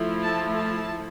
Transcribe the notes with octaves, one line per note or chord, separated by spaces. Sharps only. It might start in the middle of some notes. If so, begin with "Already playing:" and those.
Already playing: F3 A3 E4
A5
A5